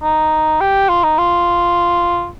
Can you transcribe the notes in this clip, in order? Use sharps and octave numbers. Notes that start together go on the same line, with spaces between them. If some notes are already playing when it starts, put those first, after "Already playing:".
D#4
G4
F4
D#4
F4